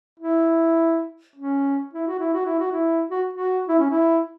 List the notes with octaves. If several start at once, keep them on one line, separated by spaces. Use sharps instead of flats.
E4
C#4
E4
F#4
E4
F#4
E4
F#4
E4
F#4
F#4
E4
C#4
E4